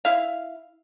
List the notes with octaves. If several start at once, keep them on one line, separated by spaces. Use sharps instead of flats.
E4 F5